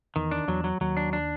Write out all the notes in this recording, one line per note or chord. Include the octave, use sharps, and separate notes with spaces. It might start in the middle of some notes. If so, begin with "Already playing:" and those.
E2 D#3 E3
D4
E2 E3 F#3
F#3
D#2 D#3 F#3
D4
D4